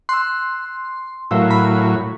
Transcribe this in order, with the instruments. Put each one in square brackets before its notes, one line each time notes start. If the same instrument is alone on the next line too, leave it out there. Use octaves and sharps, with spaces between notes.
[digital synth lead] C6 [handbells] E6 F#6
[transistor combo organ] A2 F#3 [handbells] A#4 F5 E6
[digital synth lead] B5